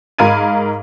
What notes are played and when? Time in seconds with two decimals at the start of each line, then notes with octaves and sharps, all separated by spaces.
0.19 G#2 A#4 F5 B5 G#6 D#7